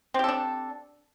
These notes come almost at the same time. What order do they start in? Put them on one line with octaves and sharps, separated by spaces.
C4 G4 A4 D4